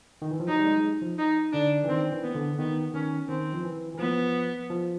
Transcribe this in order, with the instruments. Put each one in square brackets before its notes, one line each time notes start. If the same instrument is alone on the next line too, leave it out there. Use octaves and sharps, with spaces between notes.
[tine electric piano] D#3
E3
F3
[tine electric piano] F#3 [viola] D#4
[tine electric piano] G3
G#3
F3
[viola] D#4
[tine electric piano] D3 [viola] D4
[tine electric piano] E3
[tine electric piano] D#3 [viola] C4
[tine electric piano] E3
[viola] B3
[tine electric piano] D3
[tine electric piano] D#3 [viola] B3
[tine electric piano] D#3 [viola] C#4
[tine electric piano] D#3 [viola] C4
[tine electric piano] F3
E3
E3
[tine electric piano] F3 [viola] B3
[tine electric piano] F3